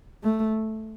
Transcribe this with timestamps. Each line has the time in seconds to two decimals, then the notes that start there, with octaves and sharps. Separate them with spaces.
0.23 A3